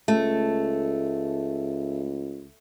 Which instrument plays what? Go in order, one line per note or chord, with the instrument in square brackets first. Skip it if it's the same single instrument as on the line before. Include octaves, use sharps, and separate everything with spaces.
[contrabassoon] C#2 [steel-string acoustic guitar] A3